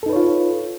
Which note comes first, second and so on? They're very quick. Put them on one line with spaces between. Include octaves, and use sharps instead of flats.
A4 D#4 B4 C#5 F4